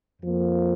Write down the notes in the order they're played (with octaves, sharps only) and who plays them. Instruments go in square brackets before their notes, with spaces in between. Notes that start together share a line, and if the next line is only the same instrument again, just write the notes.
[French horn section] F2 F3 A#3